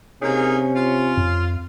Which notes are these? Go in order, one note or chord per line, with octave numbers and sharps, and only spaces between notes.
C3 A#3 C#4 D#4 G#4
F4
F2